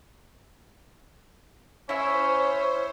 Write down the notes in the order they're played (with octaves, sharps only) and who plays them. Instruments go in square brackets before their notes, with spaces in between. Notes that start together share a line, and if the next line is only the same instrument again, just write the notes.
[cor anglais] C#4 [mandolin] E4 E5 [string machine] C5 [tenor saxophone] C#5